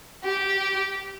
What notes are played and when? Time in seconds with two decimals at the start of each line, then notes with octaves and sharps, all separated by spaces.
0.24 G4